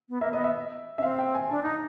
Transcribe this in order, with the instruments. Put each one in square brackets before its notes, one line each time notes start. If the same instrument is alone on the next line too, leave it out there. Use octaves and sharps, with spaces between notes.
[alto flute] B3
[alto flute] A#3 [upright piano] E5
[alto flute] B3 [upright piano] D#5
[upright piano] E5
[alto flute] C#4 [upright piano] E5
[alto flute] C4 [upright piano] F5
[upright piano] G5
G#5
[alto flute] D4 [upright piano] A5
[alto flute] D#4 [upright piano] A#5